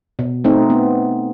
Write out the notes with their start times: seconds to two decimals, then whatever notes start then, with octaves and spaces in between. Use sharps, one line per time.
0.19 B2
0.44 A3 C4 D#4
0.70 B3